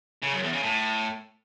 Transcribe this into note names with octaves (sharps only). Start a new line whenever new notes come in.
C#3
F#2
E2
C#3
A2